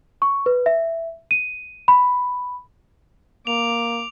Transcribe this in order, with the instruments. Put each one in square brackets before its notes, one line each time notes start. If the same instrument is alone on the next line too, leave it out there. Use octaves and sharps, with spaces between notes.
[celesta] C#6
B4
E5
D#7
B5
[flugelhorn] A#3 [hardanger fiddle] D6 [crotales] F7